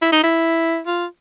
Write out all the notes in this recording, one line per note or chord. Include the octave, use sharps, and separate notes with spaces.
E4
D#4
E4
F4